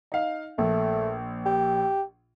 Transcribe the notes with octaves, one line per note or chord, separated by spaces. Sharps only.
D#4 F5
A#1 A3
G4